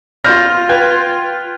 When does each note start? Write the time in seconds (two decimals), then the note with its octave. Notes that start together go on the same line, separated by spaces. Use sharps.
0.24 F4 F6 G6 A#6
0.69 B4 G5 G#6